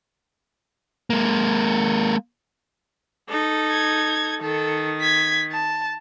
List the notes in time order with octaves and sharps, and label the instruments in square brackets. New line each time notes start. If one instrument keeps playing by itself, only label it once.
[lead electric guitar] G#3 A#3
[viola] D#4 A4
[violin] G#6
[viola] D#3 [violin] A4
[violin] G#6 B6
A5